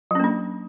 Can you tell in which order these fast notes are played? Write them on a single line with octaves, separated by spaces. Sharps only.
F#3 C#4 A#3 D4